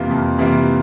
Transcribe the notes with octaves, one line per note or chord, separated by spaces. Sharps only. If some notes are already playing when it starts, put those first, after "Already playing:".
Already playing: F2 C3 E3 A#3 F4
F2
C3 E3 A#3 F4